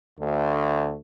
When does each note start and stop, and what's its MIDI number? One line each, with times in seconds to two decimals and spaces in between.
0.19 0.95 38
0.19 0.95 57